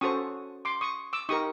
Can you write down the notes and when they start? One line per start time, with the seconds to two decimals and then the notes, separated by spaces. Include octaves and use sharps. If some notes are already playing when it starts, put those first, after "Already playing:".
0.01 C#4 F#4 A4 C5 C#6 D#6
0.65 C6 D6
0.81 C#6 D#6
1.13 D6 E6
1.29 D#4 G4 A#4 C#6 D#6